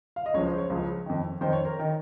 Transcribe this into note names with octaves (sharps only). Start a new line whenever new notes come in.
F5
D#5
C#2 C#3 F3 C#5
C5
C#5
C#2 C#3 F3
F2 D#3
F2 D#3 C5
C#5
A#4
D#3